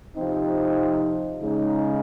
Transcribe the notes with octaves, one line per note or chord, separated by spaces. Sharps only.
C3 F3 C4 D#4
C#3 G#3 D#4